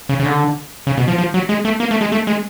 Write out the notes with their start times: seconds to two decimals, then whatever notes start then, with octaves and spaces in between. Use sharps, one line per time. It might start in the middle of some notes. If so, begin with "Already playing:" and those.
0.09 C#3
0.20 C#3
0.25 D3
0.87 C#3
0.97 B2
1.08 F3
1.18 F3
1.34 F#3
1.49 G#3
1.65 A3
1.80 A#3
1.91 A3
2.01 G#3
2.12 A3
2.27 G#3